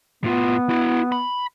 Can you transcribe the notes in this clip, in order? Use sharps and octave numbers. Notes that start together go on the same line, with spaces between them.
A2 B3 F4
E4 F#4
B5